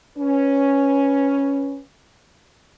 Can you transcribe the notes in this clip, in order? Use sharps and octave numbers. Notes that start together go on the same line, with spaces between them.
C#4 B4